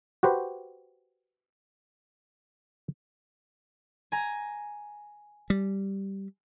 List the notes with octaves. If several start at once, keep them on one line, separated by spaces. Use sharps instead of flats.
F#4 G4 B4 C5
G#5 A#5
G3